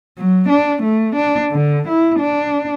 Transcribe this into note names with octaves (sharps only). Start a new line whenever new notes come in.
F#3
D4
A3
D4
D3
E4
D4